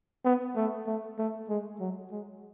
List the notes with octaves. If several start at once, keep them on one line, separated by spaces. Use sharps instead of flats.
B3
A3
A3
A3
G#3
F#3
G#3